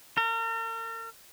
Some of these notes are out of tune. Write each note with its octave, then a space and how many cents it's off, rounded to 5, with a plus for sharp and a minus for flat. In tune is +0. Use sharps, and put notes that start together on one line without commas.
A#4 -40